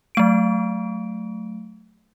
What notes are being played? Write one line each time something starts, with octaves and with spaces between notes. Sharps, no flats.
F#3 A3 D7